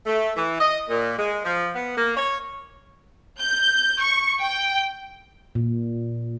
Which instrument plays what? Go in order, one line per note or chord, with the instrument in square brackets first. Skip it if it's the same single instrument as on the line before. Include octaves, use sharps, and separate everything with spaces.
[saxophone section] A3
E3
D#5
A#2
G#3
F3
B3
A#3
C#5
[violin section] G6
C#6
G5
[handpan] A#2